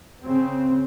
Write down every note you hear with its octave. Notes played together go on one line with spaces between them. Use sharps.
C#3 C4